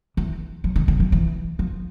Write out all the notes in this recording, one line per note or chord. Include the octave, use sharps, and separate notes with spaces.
E3
F3
D#3
D#3
F3
E3
F3